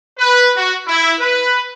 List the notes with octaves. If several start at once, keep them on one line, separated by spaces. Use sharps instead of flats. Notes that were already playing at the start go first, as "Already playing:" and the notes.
B4
F#4
E4
B4